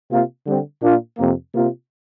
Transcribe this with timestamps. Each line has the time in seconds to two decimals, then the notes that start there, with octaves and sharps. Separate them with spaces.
0.10 C3 A#3 F4
0.46 D3 G3 C4
0.82 A#2 A#3 D4 F4
1.18 F2 C3 A#3
1.54 C3 A#3 F4